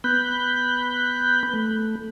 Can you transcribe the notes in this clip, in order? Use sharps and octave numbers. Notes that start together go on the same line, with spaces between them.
B3 B5 F#6 G6
A3